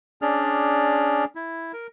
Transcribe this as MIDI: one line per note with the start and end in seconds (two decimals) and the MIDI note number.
0.22 1.25 61
0.22 1.25 62
0.22 1.25 68
0.22 1.25 74
0.22 1.25 89
1.35 1.72 64
1.73 1.87 70